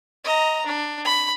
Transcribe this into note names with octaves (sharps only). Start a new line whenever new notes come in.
D#5 A#5
D4
B5